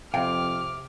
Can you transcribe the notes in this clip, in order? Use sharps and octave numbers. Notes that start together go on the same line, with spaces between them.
F2 C3 F5 G5 D6 F6